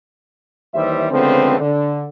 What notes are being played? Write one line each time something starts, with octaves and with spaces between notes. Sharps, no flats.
D#2 E3 G3 C5 E5
C#2 D3 F3 A3 B3 C4
D3